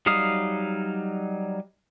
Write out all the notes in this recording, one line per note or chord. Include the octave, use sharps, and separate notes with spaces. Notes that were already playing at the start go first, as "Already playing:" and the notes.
F#3 G3 D#4 F5 D#6